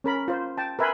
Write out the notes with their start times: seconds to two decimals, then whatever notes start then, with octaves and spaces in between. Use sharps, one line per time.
0.04 C#4 A#4 B5
0.28 F4 C5
0.58 G5 A5
0.79 A#4 B4 E5 G#5 B5 C6